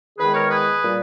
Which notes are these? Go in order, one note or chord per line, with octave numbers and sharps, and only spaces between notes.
E2 D#3 G#3 G#4 B4
A#4 C#5
G#4 B4
A#2 G3